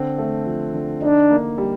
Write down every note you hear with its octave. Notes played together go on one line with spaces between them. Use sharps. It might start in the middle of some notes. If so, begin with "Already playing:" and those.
Already playing: D3 C4
A3
F3
D3
D4 D#4
A#3
G3